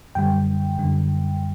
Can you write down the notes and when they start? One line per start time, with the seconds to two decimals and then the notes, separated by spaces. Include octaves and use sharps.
0.15 F#2 D3 G3 G5
0.78 F#2 D3 G3